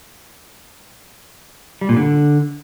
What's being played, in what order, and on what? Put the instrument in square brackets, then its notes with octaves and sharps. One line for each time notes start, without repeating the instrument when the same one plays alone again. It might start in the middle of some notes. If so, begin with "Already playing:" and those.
[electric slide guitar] G3
A#2
D3